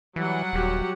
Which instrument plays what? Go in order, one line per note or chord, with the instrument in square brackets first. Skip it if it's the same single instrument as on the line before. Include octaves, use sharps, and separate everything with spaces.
[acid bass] E3 [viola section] F#3 G3 F#5
[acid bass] D#1 [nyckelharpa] F#4 G4